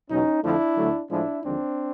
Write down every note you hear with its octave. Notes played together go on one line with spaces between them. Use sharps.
E2 B2 F#3 C#4 D#4
F2 D3 F3 A3 D4 E4
D2 D3 F#3 A3
A2 F3 G#3 D4 E4
D#2 D3 F3 G#3 C4 D4